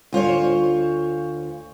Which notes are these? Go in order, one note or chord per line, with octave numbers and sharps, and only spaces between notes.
D2 F4 C5 C#5